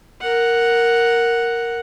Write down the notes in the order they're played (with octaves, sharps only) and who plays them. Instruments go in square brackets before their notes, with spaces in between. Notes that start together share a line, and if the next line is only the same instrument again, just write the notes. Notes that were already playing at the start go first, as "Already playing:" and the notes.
[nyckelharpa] A#4 F#5